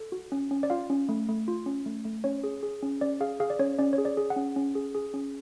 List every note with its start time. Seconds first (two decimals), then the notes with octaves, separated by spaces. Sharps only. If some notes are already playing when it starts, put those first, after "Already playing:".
Already playing: A4
0.12 F#4
0.32 C#4
0.51 C#4
0.63 D5
0.70 F4 F5
0.90 C#4
1.09 A3
1.29 A3
1.48 F4
1.66 C#4
1.86 A3
2.05 A3
2.24 C#4 C#5
2.44 G#4
2.63 G#4
2.83 C#4
3.01 C#4 D5
3.20 G#4 F5
3.40 G#4 F5
3.50 D5
3.59 C#4 C#5
3.79 C#4 D5
3.93 C#5
3.98 G#4
4.05 D5
4.17 G#4
4.30 F#5
4.36 C#4
4.56 C#4
4.75 G#4
4.95 G#4
5.14 C#4